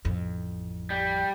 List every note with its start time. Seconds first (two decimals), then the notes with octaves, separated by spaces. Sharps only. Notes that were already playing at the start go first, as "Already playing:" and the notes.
0.05 A1 F2
0.90 G3